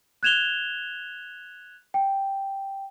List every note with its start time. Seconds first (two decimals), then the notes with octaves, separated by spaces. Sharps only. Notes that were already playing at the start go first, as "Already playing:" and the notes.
0.23 F#6 G#6 E7 F7 G7
1.94 G5